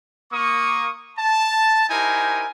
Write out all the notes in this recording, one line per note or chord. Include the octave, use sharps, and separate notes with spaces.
A#3 C#6 D#6
A5
D#4 E4 G4 A#4 C5 G#5